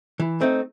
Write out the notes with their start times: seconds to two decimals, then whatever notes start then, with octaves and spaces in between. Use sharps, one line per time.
0.20 E3
0.41 A3 C4 D#4